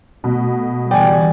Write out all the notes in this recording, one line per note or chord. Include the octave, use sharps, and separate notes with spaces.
B2 A3
D3 E3 G3 D5 G5 G#5